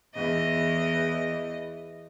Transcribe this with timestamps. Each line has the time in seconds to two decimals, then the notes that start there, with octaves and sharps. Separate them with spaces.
0.15 E2 D#5